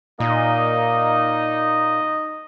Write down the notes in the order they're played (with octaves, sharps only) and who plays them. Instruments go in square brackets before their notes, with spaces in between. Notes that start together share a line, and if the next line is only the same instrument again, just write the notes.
[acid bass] A#2 [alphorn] A#3 [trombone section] D#4 [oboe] D#5